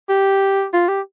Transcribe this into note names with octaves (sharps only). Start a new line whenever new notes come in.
G4
F4
G4